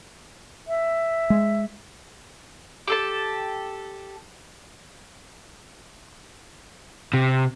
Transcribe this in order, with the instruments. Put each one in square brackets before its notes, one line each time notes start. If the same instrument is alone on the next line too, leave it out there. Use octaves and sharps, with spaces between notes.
[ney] E5
[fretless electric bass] G#3
[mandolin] G4 A4 A5
[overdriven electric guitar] C3